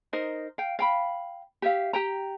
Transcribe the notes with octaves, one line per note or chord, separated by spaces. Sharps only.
D#4 A#4 C5 D#5
F5 G5
F5 G5 B5
G4 E5 F5
G4 G5 A#5